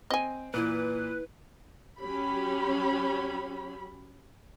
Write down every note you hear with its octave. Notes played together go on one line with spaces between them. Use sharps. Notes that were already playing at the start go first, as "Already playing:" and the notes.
C4 D#5 G#5
A#2 E3 E4 B4
F#3 C#4 G4 B5